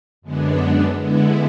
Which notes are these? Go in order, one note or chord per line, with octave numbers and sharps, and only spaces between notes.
F#2 D3 G#3 B3 D4
D3 G#3 B3 E4